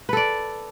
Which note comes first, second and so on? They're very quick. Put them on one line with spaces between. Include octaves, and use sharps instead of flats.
B4 A4 D5